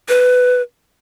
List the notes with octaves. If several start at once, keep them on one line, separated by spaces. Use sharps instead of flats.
B4